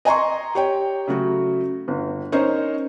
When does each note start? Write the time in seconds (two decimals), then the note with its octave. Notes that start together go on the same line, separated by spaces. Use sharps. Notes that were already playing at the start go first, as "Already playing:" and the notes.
0.05 D#5 G#5 A#5 C6 C#6
0.55 G4 C#5 G5
1.08 C#3 F#3 A3 F#4
1.88 G1
2.32 C#4 D#4 A#4 C5 C#5